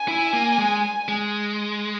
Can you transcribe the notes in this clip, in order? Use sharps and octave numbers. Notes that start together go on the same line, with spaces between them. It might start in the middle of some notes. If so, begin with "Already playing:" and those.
Already playing: G#5
E4
A#3
G#3
G#3